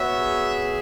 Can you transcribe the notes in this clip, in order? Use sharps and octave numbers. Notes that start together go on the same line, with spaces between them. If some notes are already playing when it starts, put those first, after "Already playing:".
Already playing: B3 F#4 C#5 E5
G#4